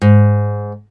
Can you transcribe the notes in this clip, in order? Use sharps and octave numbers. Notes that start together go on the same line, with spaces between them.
G#2